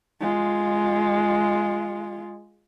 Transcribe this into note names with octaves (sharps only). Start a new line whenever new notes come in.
G#3 F4